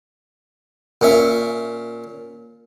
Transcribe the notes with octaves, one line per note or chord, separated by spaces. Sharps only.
A#2 C#4 E5